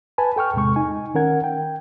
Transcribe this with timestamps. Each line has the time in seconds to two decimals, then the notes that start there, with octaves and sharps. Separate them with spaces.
0.18 B4 G#5 A5 B5
0.36 A4 G5 C#6 F6
0.54 E2 A2 C3 G#3 C#6
0.76 D#4 G#5
1.15 D#3 C#4 A#4 F#5 G#6
1.44 G5